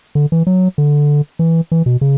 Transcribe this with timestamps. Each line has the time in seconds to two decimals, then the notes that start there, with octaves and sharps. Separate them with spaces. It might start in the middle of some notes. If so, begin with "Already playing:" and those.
0.15 D3
0.32 E3
0.47 F#3
0.78 D3
1.39 E3
1.72 E3
1.86 B2
2.01 C#3